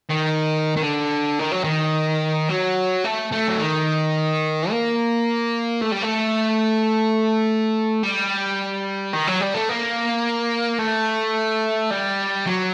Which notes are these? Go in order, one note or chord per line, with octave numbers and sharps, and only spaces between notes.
D#3
D#3
D3
D#3
F#3
D#3
F#3
A3
A3
F#3
D#3
A#3
A3
G3
A3
G3
D#3
F#3
G3
A3
A#3
A3
G3
F#3